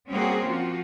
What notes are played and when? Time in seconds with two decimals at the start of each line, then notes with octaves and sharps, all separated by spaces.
0.10 G3 A#3 C4 C#4 F#4 G#4
0.47 F3 F4 F#4